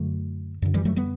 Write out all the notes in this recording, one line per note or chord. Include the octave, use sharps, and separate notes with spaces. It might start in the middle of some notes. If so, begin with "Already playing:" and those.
Already playing: F#2 D3 F#3 A3
F#2 D3
E3 G3
F#3 A3
G3 B3